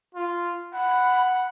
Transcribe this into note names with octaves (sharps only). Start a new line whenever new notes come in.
F4
F#5 B5